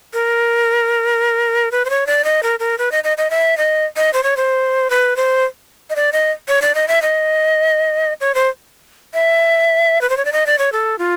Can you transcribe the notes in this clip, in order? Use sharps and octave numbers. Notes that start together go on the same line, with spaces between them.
A#4
B4
C5
C#5
D5
D#5
A#4
A#4
B4
D#5
D#5
D#5
E5
D#5
D#5
C5
C#5
C5
B4
C5
D#5
D5
D#5
C#5
D5
D#5
E5
D#5
C#5
C5
E5
B4
C5
C#5
D5
D#5
D5
C#5
A4
F4